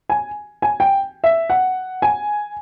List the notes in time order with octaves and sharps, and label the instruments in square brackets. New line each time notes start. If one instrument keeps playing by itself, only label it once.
[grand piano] G#5
G#5
G5
E5
F#5
G#5